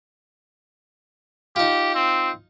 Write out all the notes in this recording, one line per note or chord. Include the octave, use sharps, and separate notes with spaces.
D#4 F4 G4
C4